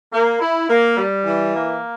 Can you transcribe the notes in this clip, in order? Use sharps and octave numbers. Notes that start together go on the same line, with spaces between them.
A#3
E4
A#3
G3
E3
A#3